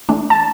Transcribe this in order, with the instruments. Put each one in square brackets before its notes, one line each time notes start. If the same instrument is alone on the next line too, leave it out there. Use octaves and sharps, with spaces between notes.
[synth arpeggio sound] E3 A3 D4
[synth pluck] A5